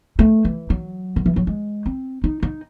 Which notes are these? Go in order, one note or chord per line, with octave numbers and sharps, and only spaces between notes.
A3
E3
F#3
D#3
E3
F#3
G#3
C4
D#4
D#4